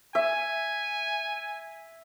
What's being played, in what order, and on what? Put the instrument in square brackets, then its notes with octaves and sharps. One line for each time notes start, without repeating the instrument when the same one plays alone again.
[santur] E5 [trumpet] G#5